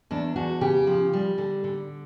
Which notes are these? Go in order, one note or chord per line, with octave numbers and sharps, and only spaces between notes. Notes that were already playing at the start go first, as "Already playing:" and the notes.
E2 D4
E2 F#4
C#3 G4
F3
G3
D3
D3